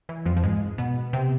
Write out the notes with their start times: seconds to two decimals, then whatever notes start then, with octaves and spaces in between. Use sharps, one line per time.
0.09 E3
0.26 F2 F3
0.37 F3
0.43 G#2 G#3
0.78 B2 B3
1.13 C3 C4